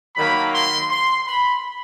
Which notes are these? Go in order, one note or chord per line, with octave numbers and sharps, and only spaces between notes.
D#3 F#3 A#3 B5
C6
C6
B5